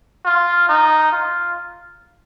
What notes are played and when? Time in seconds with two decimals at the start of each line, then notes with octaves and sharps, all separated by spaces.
0.25 F4
0.69 D#4
1.12 F4